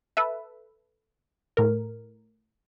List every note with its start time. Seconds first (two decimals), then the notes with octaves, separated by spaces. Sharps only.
0.17 A4 B4 E5
1.57 A2 A#4